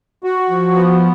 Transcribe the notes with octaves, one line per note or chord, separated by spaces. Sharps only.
F#4
F3
B3